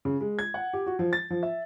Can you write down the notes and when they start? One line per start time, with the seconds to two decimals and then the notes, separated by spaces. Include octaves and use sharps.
0.05 C#3
0.21 G#3
0.39 G#6
0.54 F#5
0.73 G4
0.86 F#4
0.99 F3
1.13 A6
1.30 F3
1.43 E5